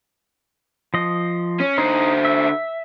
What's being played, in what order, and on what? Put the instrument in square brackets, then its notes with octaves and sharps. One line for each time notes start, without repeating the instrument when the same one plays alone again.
[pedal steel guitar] F3 D#5
[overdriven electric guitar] C#4
[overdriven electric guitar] D3 C5 [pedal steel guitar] D#4
[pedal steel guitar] E5